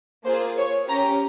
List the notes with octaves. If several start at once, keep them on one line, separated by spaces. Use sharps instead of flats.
A#3 F4 G#4 C5
C#5
C#4 G4 A#5